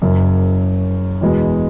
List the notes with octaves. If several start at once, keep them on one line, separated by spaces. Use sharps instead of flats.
F#1 F#2 C#3
E2 B2 G#3 B3